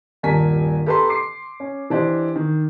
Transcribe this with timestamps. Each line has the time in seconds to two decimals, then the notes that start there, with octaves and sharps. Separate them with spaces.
0.23 D#1 G2 A#4 G#5 A5 B6
0.86 G4 A4 B4 A5 A#5 C6
1.09 C6 D6 C7
1.60 C#4
1.90 E3 D4 G4 C5 D#5
2.35 D#3